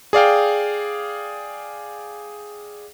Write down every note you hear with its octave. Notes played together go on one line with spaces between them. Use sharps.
G#4 D5 F5 G5